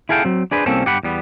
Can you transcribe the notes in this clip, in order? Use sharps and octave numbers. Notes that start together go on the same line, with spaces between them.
E4 G#4 A4 F5 G5
F#3 C4
D4 G#4 B4 C5
C2 A#3 C4 C#4 A4
G2 G4 F#5 B5
E2 G3 B3